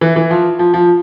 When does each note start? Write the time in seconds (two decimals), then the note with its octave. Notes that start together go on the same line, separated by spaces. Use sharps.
0.01 E3
0.16 E3
0.31 F3
0.59 F3
0.74 F3